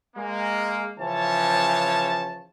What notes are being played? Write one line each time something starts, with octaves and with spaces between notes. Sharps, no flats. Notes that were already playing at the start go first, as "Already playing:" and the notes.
G#3 A#3
C#3 E3 F3 C#4 C#5 A5